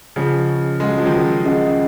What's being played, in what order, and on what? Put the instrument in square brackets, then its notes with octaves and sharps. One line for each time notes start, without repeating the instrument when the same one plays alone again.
[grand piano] C#3 F3 [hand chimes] C#4 G#4 D#5 F#5
[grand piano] G#3 [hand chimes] C#4 G#4 D#5 F#5
[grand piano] F#3
F3
D#3 F#3
[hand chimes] C#4 G#4 D#5 F#5